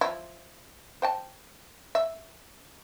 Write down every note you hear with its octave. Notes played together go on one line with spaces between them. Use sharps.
F3 E4
C5 G5 A5
E5